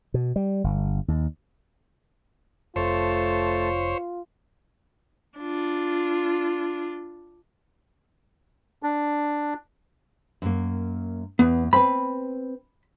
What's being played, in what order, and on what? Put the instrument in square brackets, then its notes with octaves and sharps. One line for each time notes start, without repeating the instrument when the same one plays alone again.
[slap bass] B2
G3
G1
D#2
[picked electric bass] F1 [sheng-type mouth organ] A3 A5 [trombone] F4 [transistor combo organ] C5 C#5
[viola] D4 F4
[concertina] D4
[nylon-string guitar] F#2 A#3
[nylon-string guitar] E2 [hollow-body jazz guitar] B3
[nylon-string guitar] C4 B4 [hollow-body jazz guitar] B5